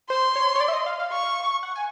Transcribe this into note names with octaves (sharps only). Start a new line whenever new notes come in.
C5 C6
C#5
C#5
D5
E5
D#5
F5
F5
C#6
F#5
G#5